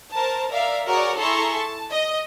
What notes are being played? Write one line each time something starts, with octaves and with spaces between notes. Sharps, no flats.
A#4 C5 A5
A#4 D5 E5 F5
F#4 G#4 A#4 C#5 D5 C#6
E4 G#4 A4 A#5 C6 C#6
A5
D#5